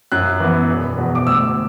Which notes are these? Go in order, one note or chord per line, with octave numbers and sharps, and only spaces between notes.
F#2 F#6
E3 B3
E1
E2 B2
D6
D2 E6